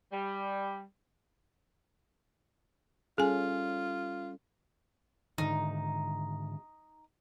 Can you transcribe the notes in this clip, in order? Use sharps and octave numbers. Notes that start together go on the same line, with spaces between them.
G3
G3 C#4 F4 G#4 A4 G#5
G#2 D3 D#3 D#4